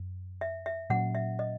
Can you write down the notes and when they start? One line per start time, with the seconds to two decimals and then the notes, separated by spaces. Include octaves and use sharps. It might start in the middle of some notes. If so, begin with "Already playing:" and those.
Already playing: F#2
0.41 E5
0.66 E5
0.90 A#2 F#3 C#4 F#5
1.15 E5
1.39 D#5